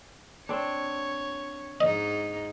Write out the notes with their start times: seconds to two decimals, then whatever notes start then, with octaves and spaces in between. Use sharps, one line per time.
0.49 C4 D4 C#5
1.81 G#2 D#4 D#5